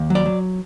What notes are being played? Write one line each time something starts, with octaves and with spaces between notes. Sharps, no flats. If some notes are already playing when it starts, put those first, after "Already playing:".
Already playing: D#2
F#3 D5
F#3